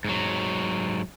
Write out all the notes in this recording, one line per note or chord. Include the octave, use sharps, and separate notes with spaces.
G#2 F#3